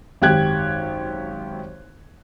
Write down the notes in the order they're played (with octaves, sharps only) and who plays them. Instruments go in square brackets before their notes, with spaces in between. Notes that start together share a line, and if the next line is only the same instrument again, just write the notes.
[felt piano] G#1 F#2 G4 F#6 G#6